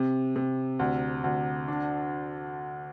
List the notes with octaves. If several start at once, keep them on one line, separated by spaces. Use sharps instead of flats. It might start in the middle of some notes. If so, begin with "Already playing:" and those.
Already playing: C3
C3
D2
D2
D4